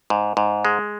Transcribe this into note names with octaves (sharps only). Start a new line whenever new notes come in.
G#2
G#2
G#3